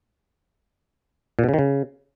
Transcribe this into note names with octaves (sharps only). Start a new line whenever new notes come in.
A#2
B2
C#3
D#3
C#3